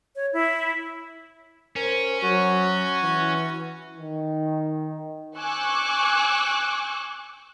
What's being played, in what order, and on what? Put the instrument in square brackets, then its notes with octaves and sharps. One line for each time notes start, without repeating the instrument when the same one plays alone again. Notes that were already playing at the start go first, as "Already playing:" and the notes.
[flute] C#5
E4
[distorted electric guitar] C#4 [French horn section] A#4 C5
[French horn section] F#3 [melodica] F#4
[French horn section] E3
[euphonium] D#3
[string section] G#5 C#6 D6 E6 F#6 G6